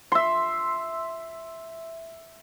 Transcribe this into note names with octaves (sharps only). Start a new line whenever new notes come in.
E5 C6